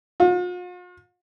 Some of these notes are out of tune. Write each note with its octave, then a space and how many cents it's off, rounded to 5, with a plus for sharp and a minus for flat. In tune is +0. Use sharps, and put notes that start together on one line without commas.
F4 +45